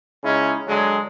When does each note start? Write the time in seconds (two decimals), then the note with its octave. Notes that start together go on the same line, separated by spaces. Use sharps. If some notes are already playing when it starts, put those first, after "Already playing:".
0.23 C#3 G#3 C#4 D#4 E4
0.67 D3 F#3 G#3